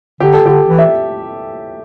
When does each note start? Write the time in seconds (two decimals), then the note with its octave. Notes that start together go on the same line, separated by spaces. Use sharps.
0.20 D3 G4
0.33 A4
0.43 D3 G4
0.67 E3
0.79 E5